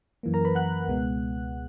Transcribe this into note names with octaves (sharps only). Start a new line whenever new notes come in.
F#2 E3 A#3
A#4 A#5
B4 B5
F#5 F#6
C#2 B2 G#3 B3